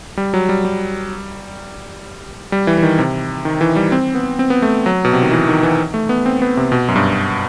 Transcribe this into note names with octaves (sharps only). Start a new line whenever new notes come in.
G3
F#3
G3
G3
G3
E3
E3
D#3
C3
D#3
E3
G3
C4
B3
C4
B3
A3
F#3
B2
C3
D#3
E3
D#3
E3
A3
B3
C4
B3
C3
B2
F#2
G2